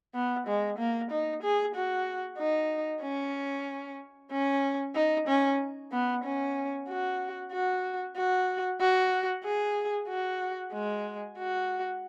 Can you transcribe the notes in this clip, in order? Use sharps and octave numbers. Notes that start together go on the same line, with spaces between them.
B3
G#3
A#3
D#4
G#4
F#4
D#4
C#4
C#4
D#4
C#4
B3
C#4
F#4
F#4
F#4
F#4
G#4
F#4
G#3
F#4